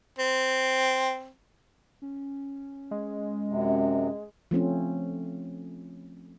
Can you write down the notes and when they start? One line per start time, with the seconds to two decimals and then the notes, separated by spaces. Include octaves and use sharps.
0.19 C4
2.02 C#4
2.91 G#3
3.48 F#2 C3
4.51 F3 A3 C4 C#4